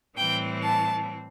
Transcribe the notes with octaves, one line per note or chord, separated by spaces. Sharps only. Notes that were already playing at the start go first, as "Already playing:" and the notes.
A2 E3 G3 C4 G5
A5